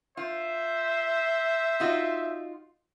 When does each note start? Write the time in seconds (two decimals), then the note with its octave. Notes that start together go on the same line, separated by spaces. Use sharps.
0.17 F4 C5 E5
1.80 D#4 F4 F#4